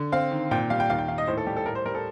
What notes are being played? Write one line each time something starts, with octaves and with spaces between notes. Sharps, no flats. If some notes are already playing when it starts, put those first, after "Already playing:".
Already playing: D3
C4 F5
D#3
A#2 G5
G3 F5
G5
D#2 F5
G5
D#3 F5
D#5
A2 C5
A4
G3 G4
A4
A2 A#4
C5
G3 A#4
A4